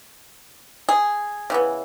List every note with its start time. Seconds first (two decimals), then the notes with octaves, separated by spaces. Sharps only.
0.89 G#4
1.50 C#3 E3 B3